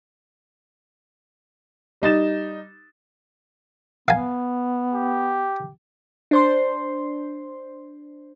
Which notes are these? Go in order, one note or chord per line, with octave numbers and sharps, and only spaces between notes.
G3 D#4 A6 E7
B3 F5 G#5
G4
D4 C5 C6